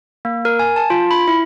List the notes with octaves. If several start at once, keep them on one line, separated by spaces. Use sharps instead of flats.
A#3
A#4
G#5
A5
F4
B5
E4